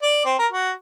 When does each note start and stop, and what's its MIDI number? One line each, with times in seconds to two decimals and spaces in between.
0.02 0.20 74
0.25 0.34 60
0.39 0.47 70
0.52 0.71 66